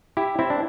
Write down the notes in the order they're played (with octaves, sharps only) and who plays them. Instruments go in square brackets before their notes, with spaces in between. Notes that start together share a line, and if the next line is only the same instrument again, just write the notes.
[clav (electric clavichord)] E4 G4
C4 E4
D4